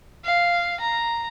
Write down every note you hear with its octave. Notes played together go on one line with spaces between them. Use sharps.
F5
A#5